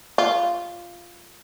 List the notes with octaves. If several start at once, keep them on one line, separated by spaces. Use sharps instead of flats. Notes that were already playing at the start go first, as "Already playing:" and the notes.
F4